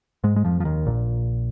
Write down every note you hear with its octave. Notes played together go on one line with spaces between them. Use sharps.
G#2 G#3
G#3
F2 F3
F3
D#2 D#3
A#1 A#2